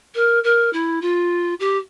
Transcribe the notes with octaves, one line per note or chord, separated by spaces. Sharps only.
A#4
A#4
E4
F4
G4